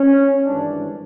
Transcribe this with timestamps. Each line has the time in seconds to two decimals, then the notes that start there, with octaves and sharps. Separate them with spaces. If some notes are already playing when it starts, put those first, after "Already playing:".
Already playing: C#4
0.45 G#1 G2 E3 D4